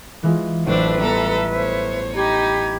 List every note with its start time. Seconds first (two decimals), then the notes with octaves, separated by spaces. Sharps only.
0.23 E3 G#3 F4
0.66 A1 F#3 D4 B4 C5 E5
1.00 G3 B3 A4 A#5 D7
1.54 C5 C#5
2.15 D#4 G4 B5 G#6